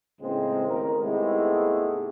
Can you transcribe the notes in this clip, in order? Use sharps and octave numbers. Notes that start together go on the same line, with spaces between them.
C#2 A2 G#3 A#3 C4
A1 D#3 A#4
G#2 C3 G#3 A3 B3 E4